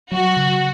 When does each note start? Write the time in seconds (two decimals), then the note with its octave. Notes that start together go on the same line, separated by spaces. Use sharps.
0.11 F#3 F#4
0.37 C#3